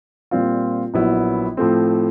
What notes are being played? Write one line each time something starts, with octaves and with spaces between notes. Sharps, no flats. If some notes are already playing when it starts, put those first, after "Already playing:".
A#2 G3 C4 F4
A#1 A#2 F#3 B3 E4
A2 F3 A3 C4